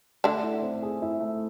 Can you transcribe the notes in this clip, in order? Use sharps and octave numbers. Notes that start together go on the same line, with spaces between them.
D3 A3 D4
E4
C4
G#4
E4
A3